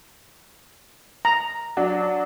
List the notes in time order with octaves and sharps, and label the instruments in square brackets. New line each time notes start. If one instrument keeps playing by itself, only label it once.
[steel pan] A#5
[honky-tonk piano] F#3 D4 D5